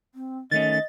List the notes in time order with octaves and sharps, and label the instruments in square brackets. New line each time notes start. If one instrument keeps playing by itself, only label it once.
[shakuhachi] C4
[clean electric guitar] D#3 A3 C#4 [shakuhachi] D#5 [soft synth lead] A6